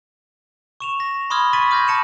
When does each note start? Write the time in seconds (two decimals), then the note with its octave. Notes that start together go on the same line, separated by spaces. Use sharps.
0.80 C#6 E7 F7
1.00 A#6
1.30 B5 C6 D6 D#6 F6 G#6
1.53 C#6 G#6 A6 B6 D#7 F#7
1.71 D6 F6 G6 G#6 A#6
1.87 A5 C#7 E7 F#7